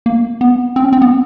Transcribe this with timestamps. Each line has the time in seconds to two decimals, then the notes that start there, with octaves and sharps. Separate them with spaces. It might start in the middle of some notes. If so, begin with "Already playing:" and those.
0.06 A#3
0.41 B3
0.76 C4
0.84 C#4
0.93 C4
1.02 B3